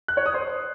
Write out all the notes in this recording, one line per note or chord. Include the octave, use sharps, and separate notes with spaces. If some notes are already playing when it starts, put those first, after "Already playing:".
F#6
C#5
D#6
C5